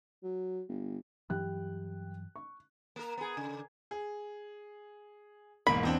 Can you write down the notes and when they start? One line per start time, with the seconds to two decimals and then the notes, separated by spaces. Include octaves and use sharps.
0.23 F#3
0.68 G1
1.30 G2 E3 F#3 G4 G5 F#6
2.36 C#6
2.96 A#3 A#4
3.18 B3 G#4
3.37 C#3
3.91 G#4
5.67 E1 G#2 A#3 B5
5.83 E2 C4 D4